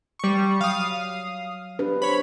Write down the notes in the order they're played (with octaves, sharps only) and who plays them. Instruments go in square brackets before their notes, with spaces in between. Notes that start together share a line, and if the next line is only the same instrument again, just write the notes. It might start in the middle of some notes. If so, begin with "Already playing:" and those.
[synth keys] G3 C#6
[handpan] F#3 [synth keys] F5 D#6
[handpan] D4 G4 B4
[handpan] C5 [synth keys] C#5 B5